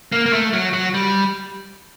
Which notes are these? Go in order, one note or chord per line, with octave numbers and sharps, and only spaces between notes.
A#3
A#3
A3
F#3
F#3
G3